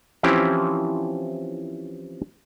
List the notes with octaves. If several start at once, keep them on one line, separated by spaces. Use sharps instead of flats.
E3 F3 C4 C#4 E4 G4